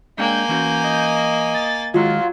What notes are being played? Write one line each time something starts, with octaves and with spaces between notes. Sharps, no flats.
G#3 A#3 D4 G5 G#5 G6
E3 C#4 F#4
D#5
A6
D#3 F#3 G#3 E4 F4